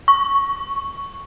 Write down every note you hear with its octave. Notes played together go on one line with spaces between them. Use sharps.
C#6